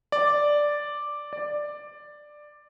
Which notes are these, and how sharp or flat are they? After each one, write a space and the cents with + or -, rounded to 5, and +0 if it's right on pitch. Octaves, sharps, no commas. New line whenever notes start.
D5 +0
D5 +10